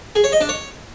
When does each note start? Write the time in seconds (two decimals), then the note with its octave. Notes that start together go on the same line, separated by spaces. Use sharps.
0.15 G#4
0.24 C#5
0.32 D#5
0.41 D4
0.49 C#5